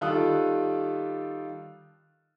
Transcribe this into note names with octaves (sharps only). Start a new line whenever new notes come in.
D#3 G3 F4 A4 D#6 F#6